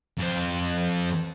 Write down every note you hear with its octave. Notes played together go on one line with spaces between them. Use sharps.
F2 C5